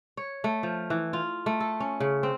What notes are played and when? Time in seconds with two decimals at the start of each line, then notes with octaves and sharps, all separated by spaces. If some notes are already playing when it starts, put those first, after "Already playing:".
0.17 C#5
0.44 A3
0.63 F3
0.90 E3
1.13 F4
1.46 A3
1.60 A4
1.80 C#4
2.00 C#3
2.23 C4